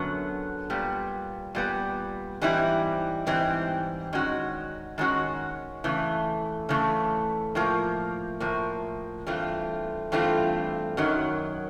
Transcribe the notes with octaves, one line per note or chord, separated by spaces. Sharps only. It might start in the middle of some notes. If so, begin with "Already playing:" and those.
Already playing: F#2 D3 F#3 B3
A#2 G3 B3
A#2 G3 B3
G#2 E3 G3 C4 E4
G#2 E3 G3 C4 E4
D#3 G#3 C#4 F#4
D#3 G#3 C#4 F#4
C#3 E3 A3
C#3 E3 A3
A2 F3 A#3
A2 F3 A#3
G2 E3 A3 C4 F4
G2 E3 A3 C4 F4
F#2 D#3 F#3